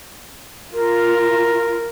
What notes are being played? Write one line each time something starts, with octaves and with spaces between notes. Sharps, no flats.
F4 A#4